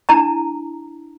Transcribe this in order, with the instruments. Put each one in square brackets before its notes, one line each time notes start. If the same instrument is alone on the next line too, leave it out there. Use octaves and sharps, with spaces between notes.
[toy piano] D4 E4 A5 A#5